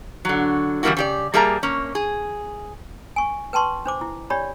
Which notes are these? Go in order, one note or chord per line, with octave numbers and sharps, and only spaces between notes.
D3 F#3
C#3 E3 G3 A#3 E4 F#4
C#3 G4 D5
G3 A#3 G#4 E5 A5 A#5
A#3 C#4
G#4
G#5 C#6
B4 G5 A5 C6 C#6
D4 C5 D6
E4
D4 G4 C#5 D5 B5